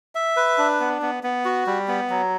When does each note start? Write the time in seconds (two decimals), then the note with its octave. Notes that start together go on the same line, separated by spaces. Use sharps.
0.15 E5
0.37 B4
0.58 D4
0.80 B3
1.02 B3
1.23 B3
1.45 F#4
1.67 G3
1.88 B3
2.10 F#3